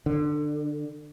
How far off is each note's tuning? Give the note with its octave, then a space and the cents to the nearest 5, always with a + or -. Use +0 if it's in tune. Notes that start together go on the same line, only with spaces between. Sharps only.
D3 +20